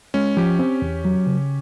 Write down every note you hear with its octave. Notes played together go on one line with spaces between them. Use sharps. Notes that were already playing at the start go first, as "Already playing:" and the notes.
G#3 C#4
F3 G4
C4
E2
F#3
C#3